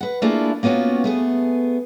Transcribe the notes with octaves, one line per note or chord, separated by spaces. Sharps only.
B4 F#5
A3 A#3 D4 E4 F4 G#4
A#3 B3 C#4 F4 F#4
A3 B3 G#4